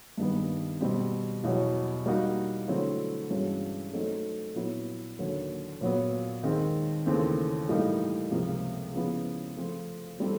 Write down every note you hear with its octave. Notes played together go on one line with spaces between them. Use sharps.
G2 D#3 G3 B3
B2 G3 C4
E2 B2 F#3
G3 A#3 D#4 F#4
D3 F#3 A3 C4 E4
G2 E3 G#3 C#4 F#4
F#3 A3 C4 D#4
A#2 F#3 B3 E4
D#2 D3 F#3
A#2 F#3 B3
D#2 D#3 G#3 C4
D#2 C#3 E3 A3 C4
A2 E3 G3 A#3 D#4
C#2 C3 F3 A#3
C#3 F3 G#3 B3 E4
F3 A3 C4 F4
E3 G3 C4 E4 A4